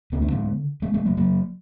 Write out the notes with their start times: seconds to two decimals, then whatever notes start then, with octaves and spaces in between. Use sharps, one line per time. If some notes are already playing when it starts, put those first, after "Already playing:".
0.12 D2 D3 B3
0.22 D4
0.32 G#3 B3
0.82 G#3 B3
0.94 G#3 B3
1.06 F#3 A#3
1.17 F#3 A#3